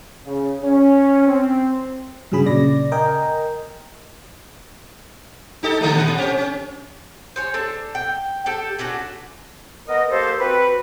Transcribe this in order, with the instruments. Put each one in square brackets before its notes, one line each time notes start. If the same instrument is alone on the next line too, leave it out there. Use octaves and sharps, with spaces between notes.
[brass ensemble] C#3
C#4
C4
[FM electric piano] G2 C#3 F#3 G#4 B5
A#2 C#3 D5 A#6
A#4 D#5 G5 G#5 A#5
[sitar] D#4 G4 A4
D3 G3 A3
A#2
C4 C#4 G4
C#4
[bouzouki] C5 C#5 G#5
D4 A4
G5
D4 G4 A4
A3 C#4 D4 F#4
[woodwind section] B3 A#4 D#5
A#3 G4 A4 C5
C4 F#4 B4